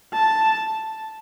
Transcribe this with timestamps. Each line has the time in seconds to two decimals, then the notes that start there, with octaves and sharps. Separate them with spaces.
0.13 A5